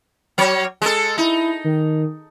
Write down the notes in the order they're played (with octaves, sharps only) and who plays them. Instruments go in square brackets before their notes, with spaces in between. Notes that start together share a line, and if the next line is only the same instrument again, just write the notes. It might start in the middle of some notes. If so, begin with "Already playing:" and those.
[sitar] F#3 C#5
G#3 A4
[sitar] D#4 [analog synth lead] E4
[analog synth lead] D#3